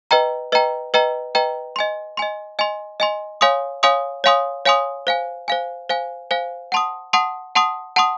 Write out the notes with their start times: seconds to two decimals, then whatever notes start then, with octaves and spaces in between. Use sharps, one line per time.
0.11 B4 D#5 G5 A#5
0.52 B4 D#5 G5 A#5
0.94 B4 D#5 G5 A#5
1.35 B4 D#5 G5 A#5
1.76 D#5 G#5 C6
2.17 D#5 G#5 C6
2.59 D#5 G#5 C6
3.00 D#5 G#5 C6
3.41 C#5 F5 G#5 C6 D#6
3.83 C#5 F5 G#5 C6 D#6
4.24 C#5 F5 G#5 C6 D#6
4.66 C#5 F5 G#5 C6 D#6
5.07 C5 F5 G#5
5.48 C5 F5 G#5
5.89 C5 F5 G#5
6.31 C5 F5 G#5
6.72 F#5 A5 C6 D#6
7.13 F#5 A5 C6 D#6
7.55 F#5 A5 C6 D#6
7.96 F#5 A5 C6 D#6